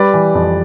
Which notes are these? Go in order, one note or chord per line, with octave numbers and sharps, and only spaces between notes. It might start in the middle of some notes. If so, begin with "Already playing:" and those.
Already playing: G3 B4 D5
E3
F2